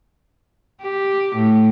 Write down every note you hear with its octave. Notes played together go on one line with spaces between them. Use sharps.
G4
A2